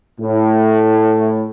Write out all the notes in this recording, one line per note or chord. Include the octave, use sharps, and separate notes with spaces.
A2